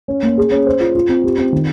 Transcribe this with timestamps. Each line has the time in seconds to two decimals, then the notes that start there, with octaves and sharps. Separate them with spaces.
0.08 C#4
0.23 A#3
0.38 G#4
0.52 C#4
0.66 C5
0.80 F4
0.95 F4
1.09 C4
1.24 G4
1.38 C4
1.52 D#3